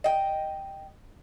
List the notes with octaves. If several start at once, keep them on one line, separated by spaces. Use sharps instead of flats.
D#5 G5